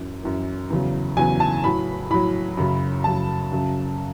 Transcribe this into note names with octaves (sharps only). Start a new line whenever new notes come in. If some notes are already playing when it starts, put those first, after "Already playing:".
Already playing: F#2 E3
F#2 E3
E2 C#3 F#3
E2 C#3 F#3 G#5
A5
A2 F#3 B5
A2 F#3 B5
F#2 C#3 F#3
F#2 C#3 F#3 A5
F#2 C#3 F#3